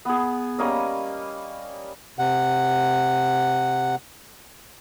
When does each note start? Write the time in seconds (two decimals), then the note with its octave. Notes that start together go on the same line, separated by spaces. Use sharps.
0.05 B3 G#4
0.59 G3 A#3 C#4 D#5
2.18 C3 F#5